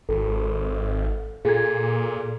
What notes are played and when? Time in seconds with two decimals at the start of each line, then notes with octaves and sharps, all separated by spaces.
0.09 G#1 A4
1.45 A#2 G#4 A4 G#6